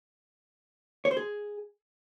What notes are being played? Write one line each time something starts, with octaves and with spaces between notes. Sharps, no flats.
C#5
C5
G#4